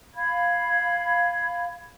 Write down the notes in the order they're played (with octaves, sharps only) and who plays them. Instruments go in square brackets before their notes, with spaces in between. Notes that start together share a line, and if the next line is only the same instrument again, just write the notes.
[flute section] F5 B5 G#6